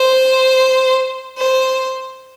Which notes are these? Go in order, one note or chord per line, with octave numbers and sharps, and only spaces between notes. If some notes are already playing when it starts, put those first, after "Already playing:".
Already playing: C5
C5